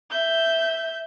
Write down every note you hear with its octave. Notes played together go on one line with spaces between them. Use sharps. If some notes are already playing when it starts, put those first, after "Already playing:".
E5 G6